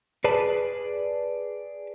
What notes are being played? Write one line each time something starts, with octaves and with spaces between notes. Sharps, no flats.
G#4 B4 D5 A5